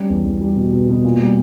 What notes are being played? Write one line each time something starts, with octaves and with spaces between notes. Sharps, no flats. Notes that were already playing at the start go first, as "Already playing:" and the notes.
Already playing: G3 C#4
E2
E2
G3
B2
B2
B2
A#2
G3